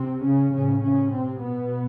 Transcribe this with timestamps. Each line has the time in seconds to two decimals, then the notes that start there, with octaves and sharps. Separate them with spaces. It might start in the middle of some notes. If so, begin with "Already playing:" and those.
Already playing: C3 C4
0.24 C#3 C#4
0.54 A2 C#3 C#4
0.84 C#3 C#4
1.14 C3 C4
1.44 B2 B3